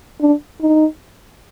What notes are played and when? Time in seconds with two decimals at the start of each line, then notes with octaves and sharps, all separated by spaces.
0.21 D4
0.61 D#4